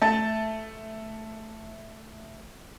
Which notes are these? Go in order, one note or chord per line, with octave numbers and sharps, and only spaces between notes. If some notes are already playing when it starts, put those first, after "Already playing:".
A3 A5 A6